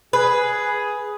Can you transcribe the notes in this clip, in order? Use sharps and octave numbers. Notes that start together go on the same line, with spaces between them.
G#4 B4